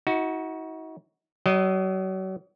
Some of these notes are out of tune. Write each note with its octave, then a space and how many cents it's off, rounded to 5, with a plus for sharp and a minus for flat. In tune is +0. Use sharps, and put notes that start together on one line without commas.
D#4 +45 F#4 +0
F#3 +35 D#5 +0